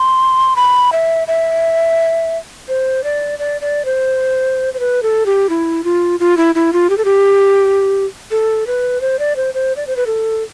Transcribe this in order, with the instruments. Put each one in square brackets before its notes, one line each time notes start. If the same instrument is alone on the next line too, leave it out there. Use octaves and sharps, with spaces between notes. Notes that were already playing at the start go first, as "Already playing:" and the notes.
Already playing: [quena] C6
B5
E5
E5
C5
D5
D5
D5
C5
C5
B4
A4
G4
E4
F4
F4
E4
E4
F4
G4
A4
G4
A4
B4
C5
D5
C5
C5
D5
C5
B4
A4